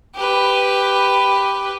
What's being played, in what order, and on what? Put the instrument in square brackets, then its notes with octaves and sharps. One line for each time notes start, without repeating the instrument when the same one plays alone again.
[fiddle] G4 B4